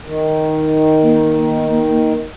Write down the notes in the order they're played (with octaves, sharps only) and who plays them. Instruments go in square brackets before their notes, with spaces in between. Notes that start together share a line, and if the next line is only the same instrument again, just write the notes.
[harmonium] D#3
[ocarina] A#3